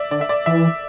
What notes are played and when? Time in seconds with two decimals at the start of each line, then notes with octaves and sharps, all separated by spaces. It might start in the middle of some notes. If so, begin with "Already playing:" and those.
Already playing: D5 E5
0.11 D3 D5
0.21 E5
0.29 D5
0.46 E3 E5